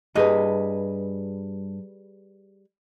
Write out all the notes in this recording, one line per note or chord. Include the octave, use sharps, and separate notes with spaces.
G2 G3 G#4 B4 D#5